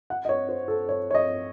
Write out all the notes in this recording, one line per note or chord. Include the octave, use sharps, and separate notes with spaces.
F#5
D#5
C#5
C5
A4
C#5
C#5
D#5